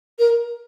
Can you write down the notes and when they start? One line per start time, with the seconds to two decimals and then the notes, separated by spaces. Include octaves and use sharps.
0.19 A#4